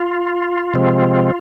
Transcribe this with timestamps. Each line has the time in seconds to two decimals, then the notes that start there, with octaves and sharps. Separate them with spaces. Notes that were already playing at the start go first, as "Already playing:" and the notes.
Already playing: F4
0.74 C3 F3 G#3 C4